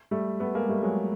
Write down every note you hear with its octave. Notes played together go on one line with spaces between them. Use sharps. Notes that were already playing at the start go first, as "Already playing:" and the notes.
G3 A3
A3 B3
G#3 A#3
G3 A3
F#3 G#3